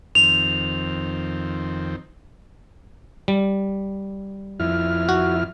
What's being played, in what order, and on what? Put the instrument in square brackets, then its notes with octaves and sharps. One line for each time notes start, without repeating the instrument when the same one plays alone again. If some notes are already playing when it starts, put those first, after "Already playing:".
[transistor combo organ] F2 D#3 C4 [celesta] F7
[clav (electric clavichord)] G3
[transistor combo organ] F2 E4 F6
[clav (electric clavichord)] F#4